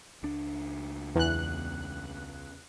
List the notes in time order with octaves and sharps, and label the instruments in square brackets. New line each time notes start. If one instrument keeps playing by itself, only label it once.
[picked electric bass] C#2 D4
[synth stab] E2 F#6